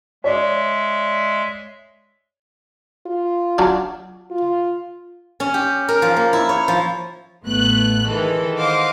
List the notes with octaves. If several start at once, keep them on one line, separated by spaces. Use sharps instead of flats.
G#3 C#5 D5 E5
F4
F#3 C#4 D4
F4
C#4
G4
A#4
F3
A#3
E4
C#5
F3
A1 A3 B3 F#6
D#3 E3 G#3 A4
C5 D#5 F5 F#5 D6